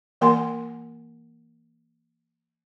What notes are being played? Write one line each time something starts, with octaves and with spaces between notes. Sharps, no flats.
E3 A#3 A#4 F#5 G#5 C6